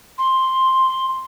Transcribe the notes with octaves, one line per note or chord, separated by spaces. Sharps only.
C6